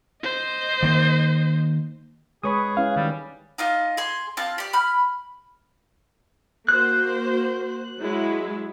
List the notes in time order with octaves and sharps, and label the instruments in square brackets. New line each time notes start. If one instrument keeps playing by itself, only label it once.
[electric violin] C5 D#5
[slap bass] D#3 A#3
[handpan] G#3 B4 C#5 [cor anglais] G#4 [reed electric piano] B5 C#6 D#6
[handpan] C#4 E4 B4 [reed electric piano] F5
[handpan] D#3 [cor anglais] G3
[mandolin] D#4 F4 D#5
G#4 C6
C4 F4 A5
G4 D5
B5 F6
[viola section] A#3 F#4 C5 [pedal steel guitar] F#6
[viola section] F#3 G#3 E4